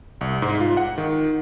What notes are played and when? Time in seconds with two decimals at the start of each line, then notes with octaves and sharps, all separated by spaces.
0.21 C2
0.42 G#2
0.61 F4
0.77 F#5
0.98 D#3